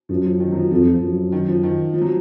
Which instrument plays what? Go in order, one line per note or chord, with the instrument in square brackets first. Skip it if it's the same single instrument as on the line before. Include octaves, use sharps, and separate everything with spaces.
[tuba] F#2 [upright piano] F3
[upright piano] F3
D#3
F#3
F3
[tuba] F2 [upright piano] F3
[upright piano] F3
[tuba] F#2
[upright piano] D#3
F3
D#3
F3
F#3